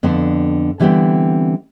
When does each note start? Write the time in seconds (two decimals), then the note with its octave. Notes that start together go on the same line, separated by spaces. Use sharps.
0.03 F2 D3 B3 D4 A5
0.80 D3 E3 G3 A3 B3 C4